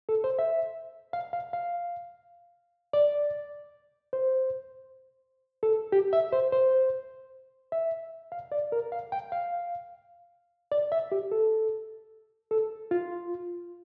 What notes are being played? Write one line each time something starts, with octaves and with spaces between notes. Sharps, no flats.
A4
C5
E5
F5
F5
F5
D5
C5
A4
G4
E5
C5
C5
E5
F5
D5
A#4
F5
G5
F5
D5
E5
G4
A4
A4
F4